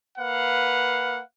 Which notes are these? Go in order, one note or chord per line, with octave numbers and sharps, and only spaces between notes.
A#3 B4 F5 F#5